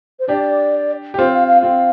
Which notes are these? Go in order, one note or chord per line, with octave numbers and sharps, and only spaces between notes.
C5
D4 G4 D5
G4
C4 F4 C5
F5
F5
C4 F4 F5